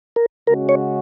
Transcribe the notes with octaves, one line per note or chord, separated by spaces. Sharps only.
A#4
C#3 G#3 C#4 F#4 A#4
C#5